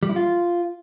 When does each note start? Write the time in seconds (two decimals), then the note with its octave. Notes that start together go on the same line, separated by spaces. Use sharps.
0.03 G3
0.09 E4
0.16 F4